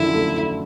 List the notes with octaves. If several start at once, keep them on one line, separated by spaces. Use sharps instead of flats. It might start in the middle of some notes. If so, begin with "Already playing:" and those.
Already playing: F#2 D3 F3 E4
A3